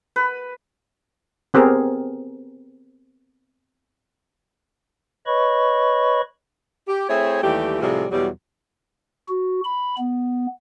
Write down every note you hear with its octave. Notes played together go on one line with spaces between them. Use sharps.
B4
B3 C4 G4 G#4 A#4
B4 C#5 D#5 B5 C#6
G4
A3 C4 E4 G#4 C5 C#5
D#2 E3 G3 A3 G4
A2 C3 F3 G3 G#3
E2 B2 F#3 G3
F#4
B5
B3